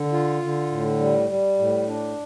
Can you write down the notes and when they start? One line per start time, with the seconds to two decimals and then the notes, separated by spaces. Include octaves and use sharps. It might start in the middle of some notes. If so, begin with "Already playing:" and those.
Already playing: D3
0.13 F4
0.42 D3
0.71 A2
0.99 G3
1.29 G3
1.59 A2
1.88 D4